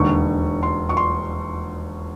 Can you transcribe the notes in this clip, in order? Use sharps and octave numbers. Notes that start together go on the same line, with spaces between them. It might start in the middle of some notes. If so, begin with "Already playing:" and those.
Already playing: E1 D#2 D3 C#6
C6
C#6
C6